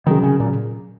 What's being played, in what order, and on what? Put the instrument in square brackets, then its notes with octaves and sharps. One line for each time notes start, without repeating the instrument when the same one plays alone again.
[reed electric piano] C3 F#3 C#4 G#4 [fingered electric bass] D#3
[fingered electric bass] C#3
A#2